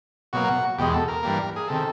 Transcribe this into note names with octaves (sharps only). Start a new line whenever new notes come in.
B2 F#3 A#3 F#4
E2 B2 G#3 G4
A4
A#4
G2 E3 G3 A#3
G#4
C3 D#3 A4